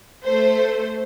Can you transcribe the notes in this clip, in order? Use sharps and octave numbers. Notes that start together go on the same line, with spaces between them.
A3 C5